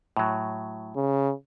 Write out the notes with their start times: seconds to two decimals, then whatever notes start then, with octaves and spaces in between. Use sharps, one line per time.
0.17 A2 F#3
0.96 C#3